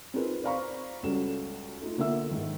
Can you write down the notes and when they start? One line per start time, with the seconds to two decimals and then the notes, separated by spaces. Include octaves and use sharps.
0.14 C4 D#4 F4 G#4 A#4 B4
0.44 C5 D5 F5 A#5 B5 C#6
1.03 C#2 G3 F#4 A4 E7
1.82 A3 D#4 F4
1.98 D3 A#3 B3 F4 E5 E6
2.31 G#2 D#3